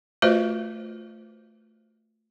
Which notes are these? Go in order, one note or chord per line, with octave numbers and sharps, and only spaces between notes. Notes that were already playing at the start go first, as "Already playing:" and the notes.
A3 F4 F#4 B4 C5 D#5